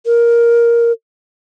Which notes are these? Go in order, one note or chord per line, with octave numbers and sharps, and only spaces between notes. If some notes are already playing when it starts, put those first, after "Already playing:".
A#4